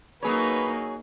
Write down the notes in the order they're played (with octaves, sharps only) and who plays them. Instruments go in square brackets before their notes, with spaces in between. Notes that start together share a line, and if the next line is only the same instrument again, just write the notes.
[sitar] F#3 G#4 C#5 [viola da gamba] A#3 D#4 [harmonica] B4